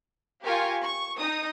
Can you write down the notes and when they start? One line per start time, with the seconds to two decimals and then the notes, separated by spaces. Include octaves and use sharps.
0.43 F4 G4 A#4 G#5 C#6
0.83 C#6
1.17 D#4 D#6